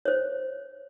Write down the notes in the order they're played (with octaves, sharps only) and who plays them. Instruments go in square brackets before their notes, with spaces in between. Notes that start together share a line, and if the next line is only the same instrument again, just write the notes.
[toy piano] C5 C#5